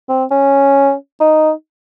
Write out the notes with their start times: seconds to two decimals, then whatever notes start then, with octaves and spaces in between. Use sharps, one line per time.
0.09 C4
0.31 C#4
1.20 D#4